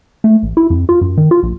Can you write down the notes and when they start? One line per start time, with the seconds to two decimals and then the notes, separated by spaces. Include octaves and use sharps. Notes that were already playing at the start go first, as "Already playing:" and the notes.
0.24 A3
0.43 A1
0.57 E4
0.70 F2
0.89 F4
1.01 F#2
1.17 D#3
1.31 F4
1.43 A#1